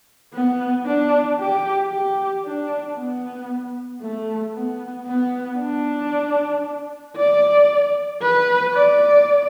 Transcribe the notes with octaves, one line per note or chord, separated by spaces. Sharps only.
B3
D4
G4
G4
D4
B3
A3
B3
B3
D4
D5
B4
D5